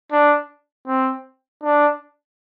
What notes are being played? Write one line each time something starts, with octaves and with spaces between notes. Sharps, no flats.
D4
C4
D4